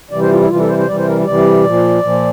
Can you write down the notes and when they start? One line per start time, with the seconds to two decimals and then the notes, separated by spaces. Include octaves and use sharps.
0.11 C3 E3 G3 D5
0.21 C5
0.31 F4
0.40 E4
0.50 C3 E3 G3 F4
0.60 A4
0.68 C5
0.79 C5
0.88 C3 E3 G3 D5
0.98 C5
1.08 A#4
1.26 C3 E3 G3 D5
1.65 A#2 F3
2.02 A#2 F3